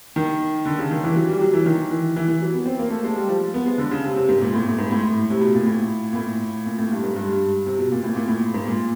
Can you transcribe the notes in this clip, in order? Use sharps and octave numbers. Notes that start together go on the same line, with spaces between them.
D#3
D3
C#3
D#3
E3
F#3
G3
F#3
E3
D#3
E3
E3
E3
F#3
B3
C4
A#3
A3
G#3
G3
F3
B3
G#3
D3
C#3
C3
C3
G#2
A#2
A2
A2
G#2
A2
A2
C3
B2
A#2
A2
A#2
A2
A#2
A2
G2
G#2
G2
G2
C3
B2
A#2
A2
A#2
A2
G#2
A#2